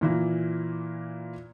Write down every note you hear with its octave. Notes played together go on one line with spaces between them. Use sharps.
A#2 E3 A#3